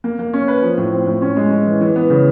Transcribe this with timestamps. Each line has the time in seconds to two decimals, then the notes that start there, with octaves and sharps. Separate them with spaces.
0.04 A#3
0.19 A#3
0.33 C#4
0.48 B4
0.63 F3
0.78 A2
0.92 C4
1.07 A2
1.22 C#4
1.37 G#3
1.51 G#3
1.66 E3
1.81 E3
1.96 B3
2.10 C#3